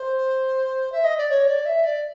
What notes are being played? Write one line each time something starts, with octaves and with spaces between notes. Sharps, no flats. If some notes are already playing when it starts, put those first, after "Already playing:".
Already playing: C5
E5
D#5
D5
C#5
D5
E5
D5